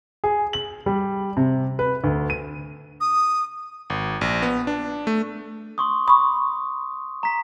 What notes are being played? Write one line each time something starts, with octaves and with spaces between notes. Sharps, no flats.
G#4
F#7
G3
C3
B4
D2
D#7
D#6
G#1
A#1
B3
D4
A3
C6 C#6 D#6
B5 C#6 D#6
A#5 B6